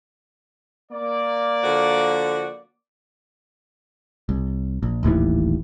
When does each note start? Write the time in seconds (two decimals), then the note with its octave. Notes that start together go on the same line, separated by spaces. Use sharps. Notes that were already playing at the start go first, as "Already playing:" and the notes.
0.92 A#3 D5
1.63 D3 F3 F#4
4.29 C2
4.83 A#1
5.03 D#1 A1 D#2 E3